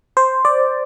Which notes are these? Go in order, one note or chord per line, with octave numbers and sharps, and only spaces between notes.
C5
D5